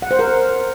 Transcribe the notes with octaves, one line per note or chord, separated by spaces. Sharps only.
F#5
C5
A#4